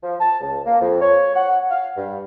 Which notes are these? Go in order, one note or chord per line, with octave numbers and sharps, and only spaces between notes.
F3
A5
C#2
A#3
F2
C#5
F#5
F5
G2